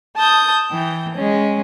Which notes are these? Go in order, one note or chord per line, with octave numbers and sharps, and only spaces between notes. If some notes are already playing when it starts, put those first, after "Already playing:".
A5 D#6 G6
E3 G5
G#3 C#4